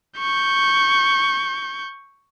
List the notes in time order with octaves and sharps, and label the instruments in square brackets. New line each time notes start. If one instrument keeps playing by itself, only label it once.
[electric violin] C#6 G6